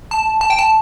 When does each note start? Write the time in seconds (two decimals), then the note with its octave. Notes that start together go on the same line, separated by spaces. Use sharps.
0.11 A5
0.41 A5
0.50 G5
0.59 A5